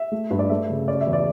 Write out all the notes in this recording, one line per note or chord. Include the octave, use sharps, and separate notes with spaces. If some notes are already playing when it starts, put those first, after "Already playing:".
Already playing: E5
A3
G2
D5
A3 E5
C#3
C#4 D5
E5
E2
D5